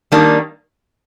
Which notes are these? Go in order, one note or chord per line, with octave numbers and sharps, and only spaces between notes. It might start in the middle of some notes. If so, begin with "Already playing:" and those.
D#3 G3 A#3 D4